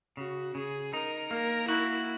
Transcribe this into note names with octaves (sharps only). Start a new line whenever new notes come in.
C#3 F#4
C#3 G#4
D#4 A#4
A#3 A#4
E4 F#4